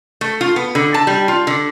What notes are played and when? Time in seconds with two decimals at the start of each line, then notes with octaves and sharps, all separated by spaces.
0.21 A3
0.41 F4
0.56 B3
0.75 D3
0.94 A5
1.07 G3
1.28 F4
1.47 D3